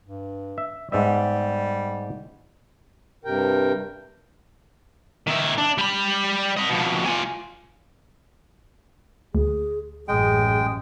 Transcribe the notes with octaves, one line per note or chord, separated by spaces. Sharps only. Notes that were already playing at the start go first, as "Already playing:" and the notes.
G2
E5
G#2 G3 B3 E5
G2 C3 A#4 G5
D#3 E4
D4
G3 B5
D#5 B5
F2 B2
F4 G#5
D2 G#4
A1 F#2 G#3 G#4 G5